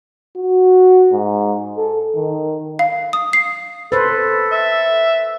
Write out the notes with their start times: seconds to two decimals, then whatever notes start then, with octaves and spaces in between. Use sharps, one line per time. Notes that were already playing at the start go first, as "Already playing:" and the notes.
0.37 F#4
1.13 G#2
1.77 A4
2.16 D#3
2.79 F5
3.13 D#6
3.33 C7
3.92 A4 B4 C5
4.52 E5